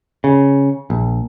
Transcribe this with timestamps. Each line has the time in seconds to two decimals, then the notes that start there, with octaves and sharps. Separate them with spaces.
0.24 C#3
0.90 A#1